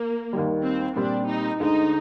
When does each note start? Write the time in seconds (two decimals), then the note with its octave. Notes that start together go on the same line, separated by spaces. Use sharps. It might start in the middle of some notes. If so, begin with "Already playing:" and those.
Already playing: A#3
0.33 D#2 D#3 G3
0.64 C4
0.96 A#2 G3 C4 D4 G4
1.27 D#4
1.60 D2 D3 G#3 D#4